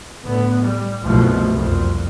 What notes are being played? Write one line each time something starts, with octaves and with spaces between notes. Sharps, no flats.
A2 D3 B3
G3
C2 F#2 B2 F3 F#3 A3
C2 F2